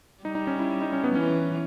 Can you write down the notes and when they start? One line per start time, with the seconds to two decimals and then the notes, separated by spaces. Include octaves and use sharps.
0.24 G3 D#4
0.35 D#4
0.47 C#4
0.59 E4
0.82 D#4
0.93 C#4
1.04 B3
1.15 E3 C#4